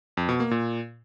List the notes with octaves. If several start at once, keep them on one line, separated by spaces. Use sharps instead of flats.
F2
B2
A#3
A#2